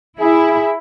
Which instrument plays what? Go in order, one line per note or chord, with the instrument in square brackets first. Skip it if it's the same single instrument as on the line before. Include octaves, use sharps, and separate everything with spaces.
[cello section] E4 [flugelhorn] G#4